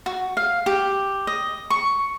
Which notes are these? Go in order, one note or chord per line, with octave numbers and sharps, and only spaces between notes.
F#4
F5
G4
D#5
C#6